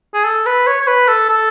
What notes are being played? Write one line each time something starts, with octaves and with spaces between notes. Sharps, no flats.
G#4
A4
B4
C#5
C#5
B4
A4
A4